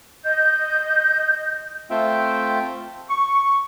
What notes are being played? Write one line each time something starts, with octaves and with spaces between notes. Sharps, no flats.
D#5 G6
A3 C4 F4 E5 G5
C#6